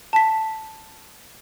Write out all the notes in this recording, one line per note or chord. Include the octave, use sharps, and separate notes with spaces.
A5 B6